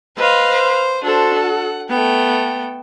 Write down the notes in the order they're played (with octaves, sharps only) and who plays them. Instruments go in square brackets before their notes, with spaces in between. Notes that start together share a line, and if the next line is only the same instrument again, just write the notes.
[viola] B4 F5 [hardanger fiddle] C5 D#5
[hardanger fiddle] C5
[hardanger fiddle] D4 C5 [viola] F#4 A4
[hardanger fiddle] F#5
[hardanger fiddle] A3 G5 [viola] B3